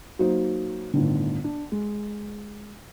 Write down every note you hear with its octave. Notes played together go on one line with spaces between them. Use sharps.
F#3 A#3 D#4 C5
G1 A2 D3 D#3
D4
G#3